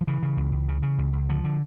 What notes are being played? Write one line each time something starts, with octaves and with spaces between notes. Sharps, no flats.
F3
C#3 E3
C#3
C#2
C#2
C#3
C#3
C#2
C#2
D3 F3
D3